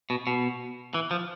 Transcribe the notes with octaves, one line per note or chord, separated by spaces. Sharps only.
B2
B2
E3
F3